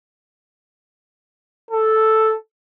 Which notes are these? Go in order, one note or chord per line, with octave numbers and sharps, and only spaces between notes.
A4